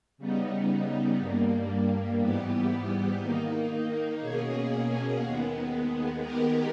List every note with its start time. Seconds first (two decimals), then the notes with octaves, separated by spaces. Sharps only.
0.18 C#3 G3 B3 D#4
1.18 G2 G3 A#3
2.19 G#2 E3 G3 B3 G4
3.19 D#3 A#3 D#4
4.20 B2 A#3 C#4 G#4
5.21 D#2 D#3 G#3 B3
6.21 D#3 G#3 B3 G4 A#4